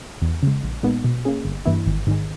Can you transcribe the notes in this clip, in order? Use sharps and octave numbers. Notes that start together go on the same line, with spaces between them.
E2
C#3 G#3
A#1
A#2 G#3 B3 D#4
B2
A#3 C#4 G#4
G1
G2 E3 A#3 E4
G#1
G#2 D#3 G#3